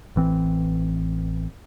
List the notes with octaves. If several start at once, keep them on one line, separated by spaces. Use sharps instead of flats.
A1 E3 C4